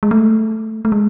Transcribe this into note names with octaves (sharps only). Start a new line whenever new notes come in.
G#3
A3
A3
G#3